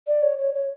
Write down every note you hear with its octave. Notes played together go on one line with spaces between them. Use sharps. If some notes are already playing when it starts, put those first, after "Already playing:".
D5
C#5
C#5
C#5